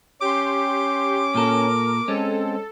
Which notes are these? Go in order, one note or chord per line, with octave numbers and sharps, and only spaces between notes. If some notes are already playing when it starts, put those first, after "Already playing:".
C#4 G4 C6 D6
A#2 A4 A#4
G#3 C4 C#4 A4